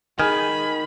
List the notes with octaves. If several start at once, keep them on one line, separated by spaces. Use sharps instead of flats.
D#3 G#4 G#5 B5 F6 G#6